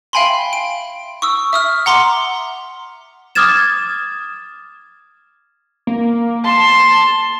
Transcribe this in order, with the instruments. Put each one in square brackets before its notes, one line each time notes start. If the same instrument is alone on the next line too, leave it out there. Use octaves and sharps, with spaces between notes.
[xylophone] E5 F5 G5 G#5 B5 C6
D7
C#6 D#6 E6
E5 D#6 F6
F#5 A#5 C6 D6
[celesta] D6 D#6 F6 G#6 A6 E7
[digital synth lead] A#3
[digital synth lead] A5 [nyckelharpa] C6